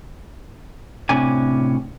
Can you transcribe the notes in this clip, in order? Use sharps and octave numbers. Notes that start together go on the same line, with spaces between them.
A2 C3 C#4 D4 G#5